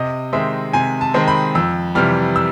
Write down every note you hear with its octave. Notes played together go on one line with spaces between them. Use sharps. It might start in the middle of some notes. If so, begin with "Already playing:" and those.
Already playing: C3 D#5
D#3 G#3 C4 E5
C3 G#5
A5
D#3 G#3 C4
B5
F2 E6
C3 E3 G3 F6
E6